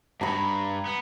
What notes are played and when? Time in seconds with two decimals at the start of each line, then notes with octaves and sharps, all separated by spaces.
0.21 G2 A#5 B5
0.86 B3